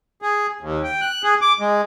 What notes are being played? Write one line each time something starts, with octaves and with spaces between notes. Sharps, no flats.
G#4
D#2
G5
F#6
G#4
D6
G#3